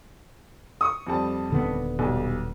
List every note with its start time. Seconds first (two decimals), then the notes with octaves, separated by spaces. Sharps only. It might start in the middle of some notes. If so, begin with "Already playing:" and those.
0.81 C#6 D#6
1.07 F2 G3 A5
1.50 D#1 D3 B3
1.99 B1 G3